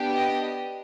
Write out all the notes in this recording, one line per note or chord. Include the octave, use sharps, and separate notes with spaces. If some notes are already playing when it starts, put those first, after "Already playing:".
Already playing: B3 D4 G4
D#5